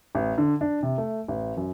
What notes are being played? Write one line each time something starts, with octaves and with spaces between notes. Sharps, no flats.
A1
D3
D4
C3
A3
A1
F#2